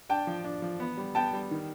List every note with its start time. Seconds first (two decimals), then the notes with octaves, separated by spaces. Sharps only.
0.09 D4 G5 A5
0.27 F3
0.45 D4
0.62 F3
0.80 B3
0.97 G3
1.15 B3 G5 A5
1.33 G3
1.51 D#3